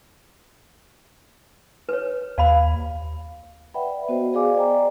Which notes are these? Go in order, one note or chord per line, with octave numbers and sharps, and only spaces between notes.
B4 C#5
D#2 D5 F5 B5
B4 D5 E5 F#5 G5 B5
B3 F#4 C5 D#5
G#4 C5 D5 F5 G#5 D6
D5 D#5 G5 G#5 A#5